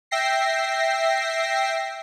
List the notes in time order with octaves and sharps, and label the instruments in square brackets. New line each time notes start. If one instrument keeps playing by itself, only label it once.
[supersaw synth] E5 G5 A#6 C7